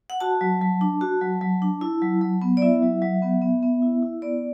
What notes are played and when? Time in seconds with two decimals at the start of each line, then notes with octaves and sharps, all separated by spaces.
0.10 F#5
0.20 F#4 A5
0.41 F#3
0.61 F#3
0.81 D4
1.01 F#4
1.21 F#3
1.41 F#3
1.62 D4
1.81 E4
2.02 F#3
2.21 F#3
2.42 B3
2.57 D5
2.62 E4 E5
2.82 F#3
3.02 F#3
3.22 B3
3.42 B3
3.63 B3
3.82 E4
4.02 E4
4.22 B3 D5